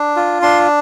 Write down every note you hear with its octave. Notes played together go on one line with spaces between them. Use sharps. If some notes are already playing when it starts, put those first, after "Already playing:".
Already playing: D4
F4
D4 C6